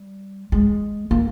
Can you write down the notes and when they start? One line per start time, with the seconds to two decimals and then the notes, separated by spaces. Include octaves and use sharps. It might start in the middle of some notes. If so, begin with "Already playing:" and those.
Already playing: G3
0.52 G#3
1.11 A#3